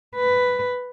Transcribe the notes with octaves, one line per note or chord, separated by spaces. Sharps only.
B4